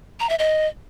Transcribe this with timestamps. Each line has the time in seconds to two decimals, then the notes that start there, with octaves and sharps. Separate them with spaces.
0.20 A#5
0.29 E5
0.39 D#5